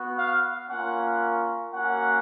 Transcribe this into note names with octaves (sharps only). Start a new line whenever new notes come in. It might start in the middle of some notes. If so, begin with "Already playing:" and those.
Already playing: B3 F#4
F5
A#3 C#4 F4 F#5
A#3 C#4 F#4 F#5